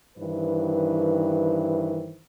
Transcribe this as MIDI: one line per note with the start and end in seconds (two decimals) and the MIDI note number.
0.18 2.19 43
0.18 2.19 51
0.18 2.19 52
0.18 2.19 64
0.18 2.19 71
0.18 2.19 72